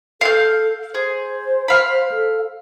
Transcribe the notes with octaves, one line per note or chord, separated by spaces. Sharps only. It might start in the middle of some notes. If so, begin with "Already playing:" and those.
A4 F5 G6
G#4 C5
F5 B5
A4